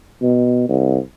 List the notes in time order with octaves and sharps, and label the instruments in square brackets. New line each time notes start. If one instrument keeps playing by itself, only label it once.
[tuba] B2
C2